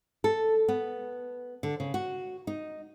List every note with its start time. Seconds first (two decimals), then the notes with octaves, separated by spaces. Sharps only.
0.24 A4
0.68 B3
1.63 D3
1.80 C#3
1.94 F#4
2.47 D#4